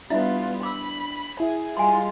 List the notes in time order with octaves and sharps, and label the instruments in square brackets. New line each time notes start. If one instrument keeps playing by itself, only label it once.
[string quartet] G3 B3 F4 [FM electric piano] D4 [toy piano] E4 E5
[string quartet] B5 [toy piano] D6 E6
[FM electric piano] E4 [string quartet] G#4
[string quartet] G3 G#3 F4 [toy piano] G#5 C6